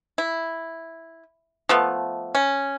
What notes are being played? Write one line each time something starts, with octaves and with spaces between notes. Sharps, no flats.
E4
F3 A3 B3
C#4